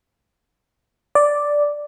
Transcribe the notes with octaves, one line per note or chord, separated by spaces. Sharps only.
D5